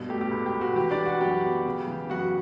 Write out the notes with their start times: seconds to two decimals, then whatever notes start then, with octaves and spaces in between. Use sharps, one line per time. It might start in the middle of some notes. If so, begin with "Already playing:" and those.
Already playing: G2 B2
0.09 A3 G4
0.21 G4
0.31 C#2
0.46 G4
0.55 C#2
0.61 F#4
0.76 E3 G4
0.91 D4 D5
0.98 G3
1.06 F#4 F#5
1.21 F#2 G4 G5
1.43 B3
1.66 C#3
1.88 E3
2.10 F#2 F#4 F#5